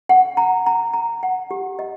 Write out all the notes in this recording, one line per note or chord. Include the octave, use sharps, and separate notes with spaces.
F#5
A#5
A#5
A#5
F#5
G4
D#5